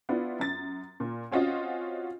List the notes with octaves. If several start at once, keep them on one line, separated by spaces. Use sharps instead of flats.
B3 D4 E4 F4
F#2 A6
A#2
C4 C#4 F4 F#4 D#5